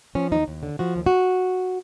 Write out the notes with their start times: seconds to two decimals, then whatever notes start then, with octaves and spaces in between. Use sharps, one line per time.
0.15 F3 C#4
0.32 D#2 D#4
0.48 D#2
0.63 D3
0.79 F3 F#4
0.96 D#2
1.06 F#4